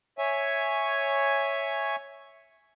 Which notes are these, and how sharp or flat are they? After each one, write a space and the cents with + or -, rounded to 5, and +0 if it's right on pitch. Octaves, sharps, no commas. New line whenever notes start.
C#5 +0 E5 +0 G#5 +0